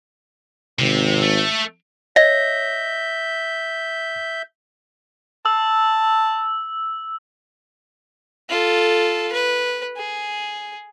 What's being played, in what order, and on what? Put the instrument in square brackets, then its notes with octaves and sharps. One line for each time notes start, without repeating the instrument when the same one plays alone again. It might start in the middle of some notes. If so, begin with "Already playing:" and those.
[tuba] G#1 [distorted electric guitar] C3
[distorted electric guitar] A3
[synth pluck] C#5 D#5 [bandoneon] E5 G6 [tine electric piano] A#6
[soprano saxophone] A5 [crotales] E6
[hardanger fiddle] F4 A4
B4
G#4